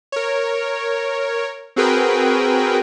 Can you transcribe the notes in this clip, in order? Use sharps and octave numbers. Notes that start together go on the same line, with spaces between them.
A#4 C#5
C4 F#4 G#4 A#4 B4 G5